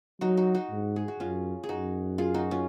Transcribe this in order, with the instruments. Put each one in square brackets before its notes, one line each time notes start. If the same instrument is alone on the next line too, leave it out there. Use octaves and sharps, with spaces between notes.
[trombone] F#3 [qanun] D#4 F#4
[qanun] D#4 F#4
D#4 F#4
[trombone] G#2
[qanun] G#4
F#4
[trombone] F#2 [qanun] C#4 F4
[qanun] G#4
[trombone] F#2 [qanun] D#4 F#4
[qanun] F4 G#4
D#4 F#4
C#4 F4